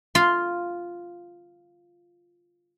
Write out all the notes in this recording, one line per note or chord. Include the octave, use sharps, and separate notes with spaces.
F4 C6